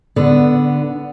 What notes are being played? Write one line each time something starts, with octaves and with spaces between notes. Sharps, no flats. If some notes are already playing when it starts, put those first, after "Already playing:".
D3 B3